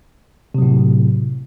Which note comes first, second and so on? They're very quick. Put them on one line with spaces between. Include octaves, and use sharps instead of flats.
C3 F#3 A2